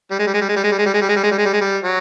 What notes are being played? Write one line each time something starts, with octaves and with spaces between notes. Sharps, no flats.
G3
G#3
G3
G#3
G3
G#3
G3
G#3
G3
G#3
G3
G#3
G3
G#3
G3
G#3
G3
G#3
G3
G#3
G3
F#3